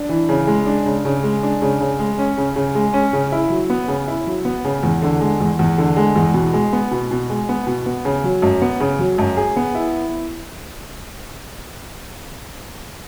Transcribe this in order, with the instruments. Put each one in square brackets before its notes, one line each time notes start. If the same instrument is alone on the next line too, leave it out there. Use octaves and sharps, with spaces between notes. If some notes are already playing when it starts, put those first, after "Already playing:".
Already playing: [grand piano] D4
E3
C#3
G#3
D4
C#3
C#3
G#3
D4
C#3
C#3
G#3
C#4
C#3
C#3
G#3
C#4
C#3
E4
F#3
B3
C#3
E4
F#3
B3
C#3
E2
D3
G#3
E2
E2
D3
G#3
E2
B2
G#3
B3
B2
B2
G#3
B3
B2
B3
C#3
F#3
F#2
B3
C#3
F#3
F#2
G#4
B3
E4